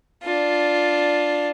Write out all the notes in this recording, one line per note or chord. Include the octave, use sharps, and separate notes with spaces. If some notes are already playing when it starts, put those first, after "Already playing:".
D4 F4